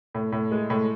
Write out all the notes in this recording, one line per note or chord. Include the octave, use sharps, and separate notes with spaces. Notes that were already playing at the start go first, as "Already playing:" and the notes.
A2
A2
G#3
A2